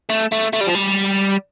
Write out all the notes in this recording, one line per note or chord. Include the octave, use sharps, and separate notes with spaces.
A3
A3
A3
G3
F3
G3